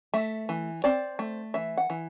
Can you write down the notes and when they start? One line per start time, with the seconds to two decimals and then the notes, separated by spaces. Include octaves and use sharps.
0.14 A3 E5
0.49 E3
0.84 C4 D5
1.19 A3
1.54 E3 E5
1.78 F#5
1.90 E3